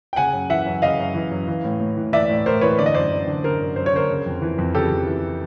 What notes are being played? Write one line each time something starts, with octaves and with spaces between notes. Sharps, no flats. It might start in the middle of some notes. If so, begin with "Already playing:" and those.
G5
C#3 F#5 G#5
F#2
E3 E5 F#5
F#2
C#3 D#5 F5
F#2
E3
F#2
E3
A2
A2
E3
E3 D5 E5
A2
A2 A#4 C5
E3 B4 C#5
D3 D5
D#5
F#2 C5 D5
F#2
D3
D3 A#4 C5
F#2
F#2 C5
C#5
D3 A#4 C5
C#3
F2
E3
F2
C#3 G4 A4
F2
E3